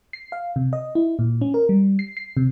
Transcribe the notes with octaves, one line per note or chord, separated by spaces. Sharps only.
C7
F5
C3
D#5
E4
A#2
C#4
A#4
G3
C7
C7
C3